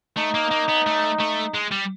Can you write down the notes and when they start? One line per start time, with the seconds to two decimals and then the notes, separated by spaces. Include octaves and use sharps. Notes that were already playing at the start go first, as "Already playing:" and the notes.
0.17 A3 D#4
0.35 A#3
0.51 A#3
0.68 B3
0.86 A3
1.20 A3
1.54 G#3
1.71 G3